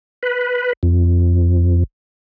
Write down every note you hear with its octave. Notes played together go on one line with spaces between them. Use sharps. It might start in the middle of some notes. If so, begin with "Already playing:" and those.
B4
F2